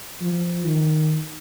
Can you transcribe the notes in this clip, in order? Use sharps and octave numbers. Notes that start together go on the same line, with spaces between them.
F3
D#3